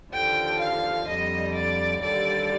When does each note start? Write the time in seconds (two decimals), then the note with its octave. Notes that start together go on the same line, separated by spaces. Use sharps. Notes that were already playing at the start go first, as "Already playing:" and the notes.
0.12 D#2 D3 F3 G5
0.59 F5
1.06 F2 D3 G3 D#5
1.54 D5
2.00 D#2 D3 G3 D5